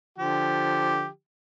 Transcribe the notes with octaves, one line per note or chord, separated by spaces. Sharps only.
D3 F3 G4